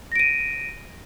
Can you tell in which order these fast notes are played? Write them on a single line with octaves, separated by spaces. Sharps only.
A#6 D7 D#7